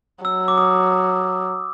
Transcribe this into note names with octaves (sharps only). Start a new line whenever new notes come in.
F#3 E6
D6
D#6